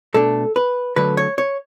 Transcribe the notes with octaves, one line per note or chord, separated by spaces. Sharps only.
B2 A3 D4 A4
B4
D3 F#3 A3 D4 B4
C#5
C#5